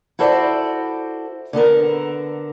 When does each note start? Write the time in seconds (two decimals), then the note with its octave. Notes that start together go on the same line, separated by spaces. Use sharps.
0.19 E4 F#4 A4 C5 D5
1.53 D3 B3 A4 A#4